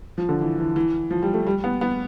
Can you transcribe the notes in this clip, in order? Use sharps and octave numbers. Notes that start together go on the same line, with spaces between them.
F3
D3
E3
E3
E3
F3
G3
A3
G3
B3
B3